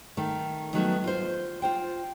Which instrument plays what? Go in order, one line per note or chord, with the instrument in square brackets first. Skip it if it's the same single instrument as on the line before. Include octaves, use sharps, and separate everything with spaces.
[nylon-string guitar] D#3 A3
D#3 F#3 A3 B3
F4 C5
F4 C5 G5